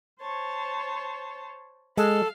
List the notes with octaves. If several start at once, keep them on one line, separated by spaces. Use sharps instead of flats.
C5 C#5 A5
G#3 A4 F5